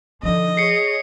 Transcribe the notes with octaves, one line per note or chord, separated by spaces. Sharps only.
D3 F3 D#4 D#5
G#4 C#5 C7 C#7